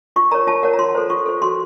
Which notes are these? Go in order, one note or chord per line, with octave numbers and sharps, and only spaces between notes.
F4 C#6
A#4 C#5 A#5
F4 A5
A#4 C#5 F#5
A#5
F4 C6
A4 C5
F4 C#6
A4 C5
F#4 C6